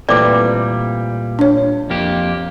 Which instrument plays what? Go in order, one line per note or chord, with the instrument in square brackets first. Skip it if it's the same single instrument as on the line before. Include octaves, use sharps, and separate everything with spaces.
[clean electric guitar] A#2 G3 [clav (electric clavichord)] E3 A3 C4 [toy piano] D5 D6
[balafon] D4 C#5
[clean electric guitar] F2 A#3 G4